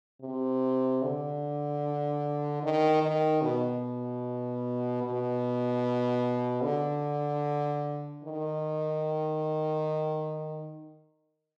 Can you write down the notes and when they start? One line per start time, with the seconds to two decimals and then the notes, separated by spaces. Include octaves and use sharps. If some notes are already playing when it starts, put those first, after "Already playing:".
0.21 C3
1.02 D3
2.63 D#3
3.02 D#3
3.42 B2
5.03 B2
6.63 D3
8.24 D#3